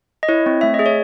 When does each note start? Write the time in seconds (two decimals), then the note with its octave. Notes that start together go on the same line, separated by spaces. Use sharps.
0.23 D#5
0.28 E4 C#5
0.46 C4
0.61 A3 E5
0.74 D#5
0.79 G#4
0.86 C#5